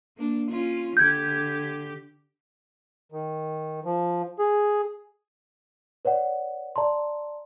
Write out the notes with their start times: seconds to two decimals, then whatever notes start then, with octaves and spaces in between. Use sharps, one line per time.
0.17 A#3 D4
0.51 C#4 F4
0.97 D3 G4 G6 G#6
3.12 D#3
3.85 F3
4.39 G#4
6.05 B4 C#5 D5 F#5
6.76 D5 A5 A#5 C6